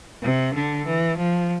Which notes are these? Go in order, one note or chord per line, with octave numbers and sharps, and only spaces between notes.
C3
D3
E3
F3